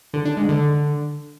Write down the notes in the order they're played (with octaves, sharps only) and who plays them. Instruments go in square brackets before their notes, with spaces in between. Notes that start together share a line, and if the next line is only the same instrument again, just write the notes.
[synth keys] D3
D4
G#3
D3